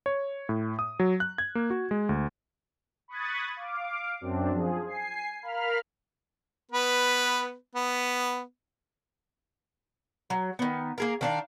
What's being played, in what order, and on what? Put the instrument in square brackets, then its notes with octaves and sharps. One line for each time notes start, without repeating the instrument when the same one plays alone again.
[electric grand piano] C#5
A2
D#6
F#3
F#6
G#6
A#3
F#4
G#3
D2
[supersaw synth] B5 C#6 D#6 F#6 G#6 A6
F5 D6
F#2 C4 D4
F3 G#4
G#5 C7
A#4 F5 B5 F6
[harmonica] B3 B4
B3
[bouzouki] F#3
D#3 B3
A#3 G#4 A#4
D#3 D4 F4